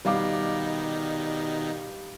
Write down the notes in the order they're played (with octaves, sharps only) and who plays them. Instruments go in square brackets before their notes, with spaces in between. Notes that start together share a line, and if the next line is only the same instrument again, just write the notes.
[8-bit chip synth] B2 D#3 D#4 [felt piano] G3 F5 D6